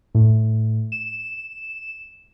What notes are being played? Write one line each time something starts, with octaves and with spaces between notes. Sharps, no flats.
A2
E7